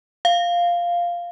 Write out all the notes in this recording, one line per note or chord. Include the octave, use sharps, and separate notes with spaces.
F5